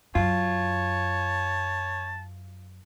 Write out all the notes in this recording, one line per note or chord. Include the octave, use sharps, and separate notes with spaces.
F#2 F4 C#5 A5